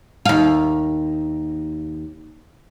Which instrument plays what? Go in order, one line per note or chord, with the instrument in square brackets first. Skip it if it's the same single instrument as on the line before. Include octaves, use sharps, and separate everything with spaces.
[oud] D#2 F5